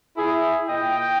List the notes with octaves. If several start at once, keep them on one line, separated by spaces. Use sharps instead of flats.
E4 G#4
A#2 A#3 E4 D#5 G5